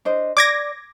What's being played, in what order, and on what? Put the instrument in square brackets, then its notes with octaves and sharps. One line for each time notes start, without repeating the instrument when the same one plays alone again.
[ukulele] D4 C5 D#5
[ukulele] D5 [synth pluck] D6 G#6 A#6